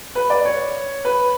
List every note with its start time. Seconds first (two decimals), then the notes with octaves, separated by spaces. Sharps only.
0.15 B4
0.30 D5
0.45 C#5
1.05 B4